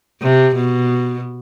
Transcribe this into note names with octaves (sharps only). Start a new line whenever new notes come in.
C3
B2